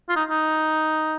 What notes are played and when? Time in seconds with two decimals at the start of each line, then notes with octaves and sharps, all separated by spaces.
0.09 F4
0.16 D#4
0.30 D#4